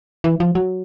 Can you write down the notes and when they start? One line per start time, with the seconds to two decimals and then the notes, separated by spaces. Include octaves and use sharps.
0.24 E3
0.40 F3
0.55 F#3